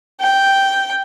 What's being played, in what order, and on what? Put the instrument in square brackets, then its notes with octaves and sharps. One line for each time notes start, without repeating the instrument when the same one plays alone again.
[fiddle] G5